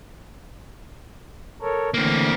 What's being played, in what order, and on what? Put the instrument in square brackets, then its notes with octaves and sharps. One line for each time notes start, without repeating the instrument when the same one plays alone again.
[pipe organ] A4 A#4 C#5
[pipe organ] D3 E3 A3 [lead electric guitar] A#3 C4